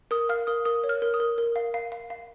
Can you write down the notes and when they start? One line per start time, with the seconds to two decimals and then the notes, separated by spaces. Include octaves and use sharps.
0.11 A#4 D#6
0.29 F5 F6
0.47 A#4 D#6
0.65 A#4 D#6
0.84 C#5
0.89 F6
1.02 A#4
1.14 D#6
1.20 A#4
1.38 A#4
1.56 F5
1.74 F5
1.92 F5
2.10 F5